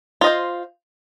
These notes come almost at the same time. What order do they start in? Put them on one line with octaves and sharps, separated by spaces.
F4 D#5 C5